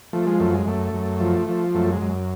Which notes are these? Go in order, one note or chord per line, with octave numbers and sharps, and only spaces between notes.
F3 A3
G#3
F#2 A3
G#3
F#2 A3
F#2
F3
F3
F#2 A3
G#3
F#2